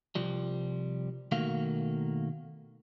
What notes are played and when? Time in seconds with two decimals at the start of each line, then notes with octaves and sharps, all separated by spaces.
0.15 C2 F3 G3
1.32 B2 D#3 A3 A#3 F#4 F5